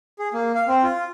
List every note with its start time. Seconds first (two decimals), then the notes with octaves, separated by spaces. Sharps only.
0.19 G#4
0.34 A#3
0.55 F5
0.67 C4
0.83 F4